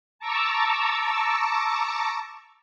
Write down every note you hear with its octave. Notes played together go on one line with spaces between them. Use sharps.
A5 A#5 C#6 D6 E6